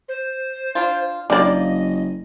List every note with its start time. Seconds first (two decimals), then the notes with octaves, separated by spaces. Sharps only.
0.09 C5
0.75 D4 F4
1.30 F#1 F3 A#3 D4 D5 D#5